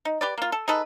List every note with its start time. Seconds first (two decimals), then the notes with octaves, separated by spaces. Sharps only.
0.05 D#4
0.21 G4 B4 D5
0.38 A#3 F4
0.52 A4
0.68 D#4 G#4 A4 B4